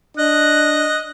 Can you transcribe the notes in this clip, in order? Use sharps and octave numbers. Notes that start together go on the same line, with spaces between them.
D4 D#5 F#6